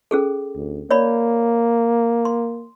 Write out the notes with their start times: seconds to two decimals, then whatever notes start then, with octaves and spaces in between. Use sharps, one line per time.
0.11 C#4 G#4 A4
0.56 D2
0.91 A#3 C#5 D5 B5
2.25 C6